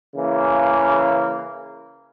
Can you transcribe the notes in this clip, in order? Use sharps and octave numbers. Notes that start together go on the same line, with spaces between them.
C#3 E3 A#3